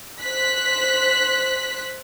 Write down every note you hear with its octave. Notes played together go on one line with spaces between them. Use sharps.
C5 F#6 B6